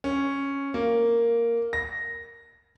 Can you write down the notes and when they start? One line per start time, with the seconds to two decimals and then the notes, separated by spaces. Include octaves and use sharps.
0.04 C#4
0.74 A#3
1.73 A#6